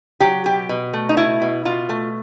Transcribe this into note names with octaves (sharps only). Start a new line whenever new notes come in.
F#3 G4
B2 G4
B2
A3
D#4
B2 E4
B2
B2 F4
A3